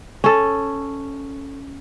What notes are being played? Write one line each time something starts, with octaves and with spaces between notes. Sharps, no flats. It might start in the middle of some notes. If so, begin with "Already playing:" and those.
C#4 A4